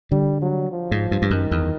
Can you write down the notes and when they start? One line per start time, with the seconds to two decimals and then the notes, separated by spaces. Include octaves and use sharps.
0.11 D3 G3
0.42 F#3
0.71 F3
0.91 G#2
1.11 G2
1.22 G2
1.31 F#2 D#3
1.51 E2